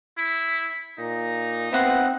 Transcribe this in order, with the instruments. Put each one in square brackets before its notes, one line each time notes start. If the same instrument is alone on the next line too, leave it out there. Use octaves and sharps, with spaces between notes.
[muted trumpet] E4
[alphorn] A#2 [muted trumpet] D#4
[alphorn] B3 [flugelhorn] C4 [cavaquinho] E4 F#5 C6